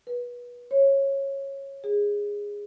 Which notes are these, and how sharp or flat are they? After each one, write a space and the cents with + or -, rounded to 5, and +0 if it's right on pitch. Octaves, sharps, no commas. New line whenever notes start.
B4 -25
C#5 -15
G#4 -15